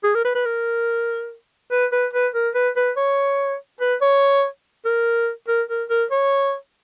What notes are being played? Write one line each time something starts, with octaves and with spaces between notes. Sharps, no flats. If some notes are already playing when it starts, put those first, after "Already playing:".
G#4
A#4
B4
B4
A#4
B4
B4
B4
A#4
B4
B4
C#5
B4
C#5
A#4
A#4
A#4
A#4
C#5